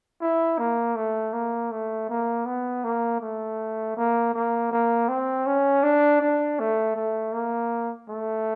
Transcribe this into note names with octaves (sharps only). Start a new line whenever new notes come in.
E4
A#3
A3
A#3
A3
A#3
B3
A#3
A3
A#3
A#3
A#3
C4
C#4
D4
D4
A3
A3
A#3
A3